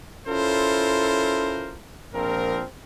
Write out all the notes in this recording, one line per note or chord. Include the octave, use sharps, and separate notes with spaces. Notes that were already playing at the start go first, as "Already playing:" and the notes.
C#4 E4 F4 A4 A#4 C5
A#1 F3 C4 A#4